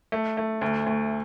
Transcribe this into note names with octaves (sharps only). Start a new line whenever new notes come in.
A3
A3
D2
D2